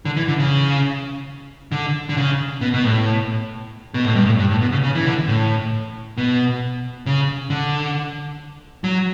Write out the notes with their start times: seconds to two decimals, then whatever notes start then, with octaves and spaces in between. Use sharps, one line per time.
0.05 D3
0.17 E3
0.28 D3
0.39 C#3
1.72 D3
2.09 D3
2.17 C#3
2.61 B2
2.74 B2
2.84 A2
3.94 B2
4.05 A2
4.15 G2
4.26 A2
4.39 G2
4.51 A2
4.61 B2
4.72 C#3
4.84 C#3
4.95 E3
5.06 D3
5.28 A2
6.17 B2
7.06 C#3
7.50 D3
8.84 F#3